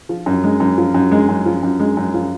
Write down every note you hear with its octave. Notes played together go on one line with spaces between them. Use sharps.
F3
F#2
G#3
F#2
F3
F#2
G#3
F#2
F3
F#2
G#3
F#2
F3